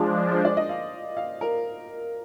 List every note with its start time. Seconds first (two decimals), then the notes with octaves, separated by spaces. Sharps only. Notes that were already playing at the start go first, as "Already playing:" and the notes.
Already playing: F3 G#3 D4 F5
0.31 C5
0.45 D5
0.57 D#5
0.69 F5
1.17 F5
1.41 A#4